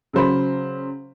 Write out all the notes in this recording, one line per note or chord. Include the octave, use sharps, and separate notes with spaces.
C#3 F#3 C5 B5